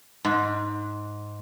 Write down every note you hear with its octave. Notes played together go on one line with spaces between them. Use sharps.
G#2